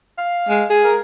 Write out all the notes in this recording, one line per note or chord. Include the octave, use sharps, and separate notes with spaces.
F5
G#3
G#4
A#4